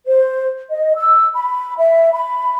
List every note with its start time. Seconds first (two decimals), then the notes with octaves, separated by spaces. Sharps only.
0.06 C5
0.70 D#5
0.96 E6
1.35 B5
1.77 E5
2.12 B5